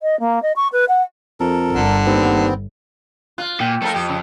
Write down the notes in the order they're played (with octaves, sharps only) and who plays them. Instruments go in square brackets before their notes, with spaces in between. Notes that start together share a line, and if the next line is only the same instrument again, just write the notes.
[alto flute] D#5
A#3
D#5
C#6
B4
F#5
[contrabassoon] F2 [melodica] A4 A#4
[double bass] G1 [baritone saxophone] D3
[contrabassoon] D#2 [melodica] B3 C4
[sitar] F4 [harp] F#6 A6
[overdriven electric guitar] A#2 [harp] G5
[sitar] F3 D#4 A#4 [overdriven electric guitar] A3 A4 [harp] E6 C7
[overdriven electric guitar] F2 [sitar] G4
[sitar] C#3